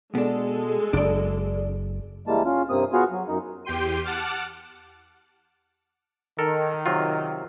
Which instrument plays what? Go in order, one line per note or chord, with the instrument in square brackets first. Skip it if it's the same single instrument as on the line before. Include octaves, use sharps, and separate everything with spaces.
[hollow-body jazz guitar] B2 D4 [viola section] G#3 A4
[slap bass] F#1 [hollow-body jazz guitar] D4 D5
[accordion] E3 G3 G#3 A#3 A5
C#4 F4
G2 C3 A#3 C4 D#6
B3 F4 F#4 G#4 C#5
F#3
F#2 D#4
[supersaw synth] E2 G4 G5 C6 D#7
F#5 A5 D6 F6
[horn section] D#3 [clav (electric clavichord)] A4 A#4
[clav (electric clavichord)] C3 F#3 F4